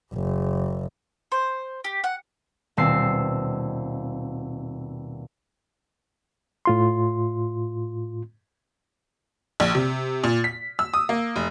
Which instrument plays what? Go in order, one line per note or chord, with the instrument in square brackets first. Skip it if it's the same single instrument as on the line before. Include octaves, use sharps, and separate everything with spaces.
[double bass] F#1
[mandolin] C5
G4
F#5
[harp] D#1 B2 C4 A5 E6 C7
[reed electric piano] A2 F4 C6
[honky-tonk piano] A#1
C3
A#2
B6
E6
D#6
A#3
F1